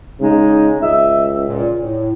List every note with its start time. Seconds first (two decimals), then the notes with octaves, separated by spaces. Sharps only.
0.21 C#3 G#3 D#4
0.81 C#2 D#5 E5
1.46 A#2
1.80 A2